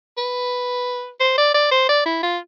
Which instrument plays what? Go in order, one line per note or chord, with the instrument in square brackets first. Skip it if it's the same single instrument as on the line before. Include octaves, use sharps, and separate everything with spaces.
[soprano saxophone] B4
C5
D5
D5
C5
D5
E4
F4